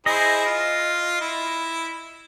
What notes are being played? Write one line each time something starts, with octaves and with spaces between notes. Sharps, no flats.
E4 G#4 C5 D#5
F4
E4